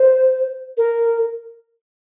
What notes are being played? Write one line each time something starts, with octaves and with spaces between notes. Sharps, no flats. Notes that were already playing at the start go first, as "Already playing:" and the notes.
Already playing: C5
A#4